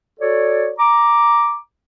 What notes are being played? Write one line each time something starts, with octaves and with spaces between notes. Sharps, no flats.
F#4 A4 C#5 D5
A#5 D6